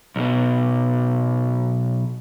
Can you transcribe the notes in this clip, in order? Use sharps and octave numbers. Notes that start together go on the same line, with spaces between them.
B1 B2